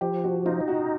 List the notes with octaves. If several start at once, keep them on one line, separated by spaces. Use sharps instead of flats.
F3 G4
F#4
D#4 F4
F#4